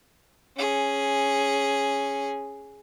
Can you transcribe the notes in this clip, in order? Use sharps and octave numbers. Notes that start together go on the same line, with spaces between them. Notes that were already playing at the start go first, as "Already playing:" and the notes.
C#4 G#4